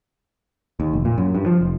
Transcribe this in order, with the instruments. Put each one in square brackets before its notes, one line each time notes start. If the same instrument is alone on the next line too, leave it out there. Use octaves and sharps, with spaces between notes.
[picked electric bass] D#2
F1
A#2
F#2
G2
F3
F1